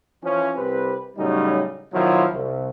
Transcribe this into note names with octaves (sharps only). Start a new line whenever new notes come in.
E3 F3 C#4
C2 C4 G4 B4
A2 C#3 F#3 G3 C#4 D#4
B2 D#3 F3 F#3 E4 F4
C2